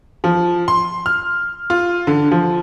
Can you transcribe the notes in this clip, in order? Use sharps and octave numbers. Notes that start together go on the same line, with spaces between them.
F3
C6
F6
F4
D3
F3